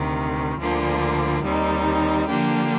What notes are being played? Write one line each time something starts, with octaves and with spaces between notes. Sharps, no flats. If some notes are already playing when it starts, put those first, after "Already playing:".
Already playing: D2 C3 D#3
D2 D3 F3 A#3 D4
D#2 D#3 G3 C4 D#4
D3 F3 A#3 D4 G4